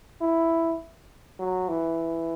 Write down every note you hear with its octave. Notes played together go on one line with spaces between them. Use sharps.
E4
F#3
E3